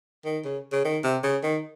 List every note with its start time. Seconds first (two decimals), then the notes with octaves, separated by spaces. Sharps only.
0.25 D#3
0.44 C#3
0.72 C#3
0.84 D#3
1.03 C3
1.23 C#3
1.43 D#3